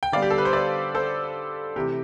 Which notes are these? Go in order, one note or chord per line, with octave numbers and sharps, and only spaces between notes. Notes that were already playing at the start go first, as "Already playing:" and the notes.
G5
D3 G3 B3 D5 F5
G4
A4
B4
C5
B4 D5
A4 C5
C3 E3 A3 G4